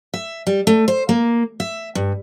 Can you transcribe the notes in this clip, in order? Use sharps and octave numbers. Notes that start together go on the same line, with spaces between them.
E5
G3
A3
C5
A#3
E5
G2